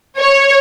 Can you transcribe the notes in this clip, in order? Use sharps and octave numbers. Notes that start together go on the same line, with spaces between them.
C#5